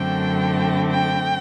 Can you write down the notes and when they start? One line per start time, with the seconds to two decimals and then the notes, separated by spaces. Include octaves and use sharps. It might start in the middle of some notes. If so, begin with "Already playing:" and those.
Already playing: F#2 D3 A3 C4 G5
0.92 G5